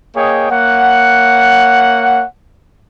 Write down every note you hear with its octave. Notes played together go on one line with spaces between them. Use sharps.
A#3 G#4 C#5 D#5 G5
A#3 C#5 F#5